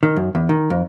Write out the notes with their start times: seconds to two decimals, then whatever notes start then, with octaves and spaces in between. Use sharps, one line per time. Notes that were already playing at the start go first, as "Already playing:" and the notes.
0.03 D#3
0.16 F#2
0.35 E2
0.49 D#3
0.70 F2